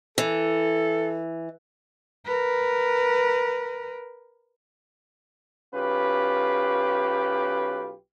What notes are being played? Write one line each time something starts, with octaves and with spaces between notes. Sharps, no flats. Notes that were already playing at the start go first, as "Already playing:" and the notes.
E3 A4
A#4 B4
B1 C#4 F4 G4 B4